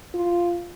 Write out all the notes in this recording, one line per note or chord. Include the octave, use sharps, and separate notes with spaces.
F4